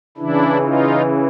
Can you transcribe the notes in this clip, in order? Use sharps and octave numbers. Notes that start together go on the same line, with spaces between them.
C#3 E3 D4 E4
D#4 F4